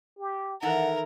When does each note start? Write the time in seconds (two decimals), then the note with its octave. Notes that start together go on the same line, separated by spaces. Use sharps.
0.19 G4
0.62 D#3 E3 A4 A#4 F#5